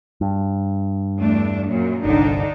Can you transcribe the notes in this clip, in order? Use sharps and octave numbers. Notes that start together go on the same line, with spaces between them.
G2
E2 A3 D4
F#2 A#2 F#3
G1 C2 D3 D4 D#4